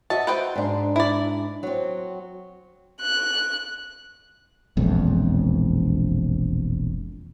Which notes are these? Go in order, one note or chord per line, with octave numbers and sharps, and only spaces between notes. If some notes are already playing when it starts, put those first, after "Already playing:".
F#4 D#5 E5 A5
B4 C5 G5
G#2 D4
E4 D5
F#3 C4
F#6
E1 A#1 F2